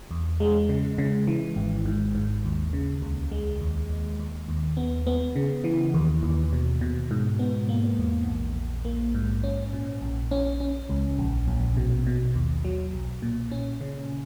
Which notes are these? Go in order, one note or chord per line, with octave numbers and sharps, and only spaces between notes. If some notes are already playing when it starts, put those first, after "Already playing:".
E2
G#3
C#3
C#3
E3
G#1
G#2
G#2
D#2
C#3
C#2
G#3
D#2
D#2
D#2
D#2
B3
B3
C#3
E3
D#2
D#2
B2
B2
G#2
B3
A#3
E2
A#1
A#1
A#3
G#2
C#4
A#2
A#1
C#4
C#4
C#2
A#1
A#1
B2
B2
D#2
F#3
B1
A#2
C#4
C#3